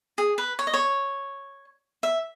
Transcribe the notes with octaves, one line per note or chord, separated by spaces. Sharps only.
G#4
B4
C#5
D#5
C#5
E5